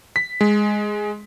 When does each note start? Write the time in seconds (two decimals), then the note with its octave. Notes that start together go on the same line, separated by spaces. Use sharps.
0.16 B6
0.41 G#3